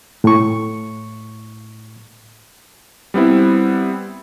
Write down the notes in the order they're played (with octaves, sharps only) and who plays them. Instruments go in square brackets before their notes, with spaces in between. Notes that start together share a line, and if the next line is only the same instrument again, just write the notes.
[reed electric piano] A2 C#6
[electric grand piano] G3 B3 C4 E4